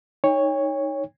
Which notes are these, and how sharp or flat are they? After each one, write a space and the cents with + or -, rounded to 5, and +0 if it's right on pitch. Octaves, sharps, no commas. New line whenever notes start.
D#4 +0 C#5 +0 G5 +45